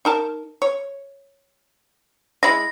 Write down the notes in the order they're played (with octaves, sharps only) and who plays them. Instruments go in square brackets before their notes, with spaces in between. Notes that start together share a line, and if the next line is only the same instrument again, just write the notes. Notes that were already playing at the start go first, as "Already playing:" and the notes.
[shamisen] D#4 A#4 A5
C#5
[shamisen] G#3 E4 [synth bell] A#6